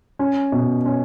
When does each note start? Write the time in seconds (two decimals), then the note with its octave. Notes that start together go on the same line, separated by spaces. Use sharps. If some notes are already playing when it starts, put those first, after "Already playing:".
0.19 C#4
0.52 B2
0.86 C#4